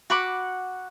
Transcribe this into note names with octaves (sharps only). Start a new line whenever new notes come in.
F#4 F#5 B5 D6